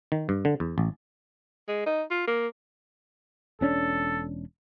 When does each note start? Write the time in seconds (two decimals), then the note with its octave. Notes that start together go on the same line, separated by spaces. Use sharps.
0.12 D#3
0.29 G2
0.45 D3
0.60 E2
0.78 A1
1.68 G#3
1.86 D#4
2.11 F4
2.27 A#3
3.61 E1 C#4 D4 A4